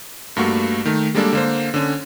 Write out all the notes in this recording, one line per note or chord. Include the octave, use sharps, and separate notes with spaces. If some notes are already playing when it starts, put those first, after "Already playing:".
G2 A3 A#3 F#4 C#6
D#3 A3
G3 G#3 A#3 D4 A4 D5
D3 A#3 C5
D3 C#4